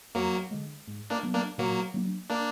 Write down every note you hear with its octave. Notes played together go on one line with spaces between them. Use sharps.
F2 F#3 A#3
D3 G#3
G#2
A#3 D4
F#3 B3
A#3 D4
A#2 F#3 A#3
F#3 A#3 D4
A#3 D4